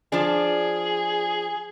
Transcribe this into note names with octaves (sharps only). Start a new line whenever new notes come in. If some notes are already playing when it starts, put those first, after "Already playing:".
F3 D4 G#4